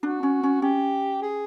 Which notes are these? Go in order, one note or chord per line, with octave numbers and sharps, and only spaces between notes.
D4 F#4
C#4
C#4
C#4 G4
G#4